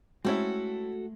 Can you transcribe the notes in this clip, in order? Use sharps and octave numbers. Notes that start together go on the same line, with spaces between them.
G#3 A3 C4 C#4 E4 F#4 A4